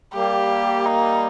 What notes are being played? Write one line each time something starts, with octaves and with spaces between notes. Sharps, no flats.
G3 A#3 G4
D#4